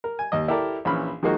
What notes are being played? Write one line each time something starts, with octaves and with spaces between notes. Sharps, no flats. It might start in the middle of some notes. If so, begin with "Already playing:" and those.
A#4
G#5
D#2 D#5
E4 G4 A4 A#4 D5
A#1 E3 C#4 B5 F6
D#3 F3 G#3 A#3 D#4 F#4